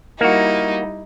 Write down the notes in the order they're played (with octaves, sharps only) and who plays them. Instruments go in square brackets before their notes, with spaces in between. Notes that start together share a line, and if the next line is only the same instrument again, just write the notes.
[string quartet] G3 D#4 E4 [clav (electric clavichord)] A#3 F#4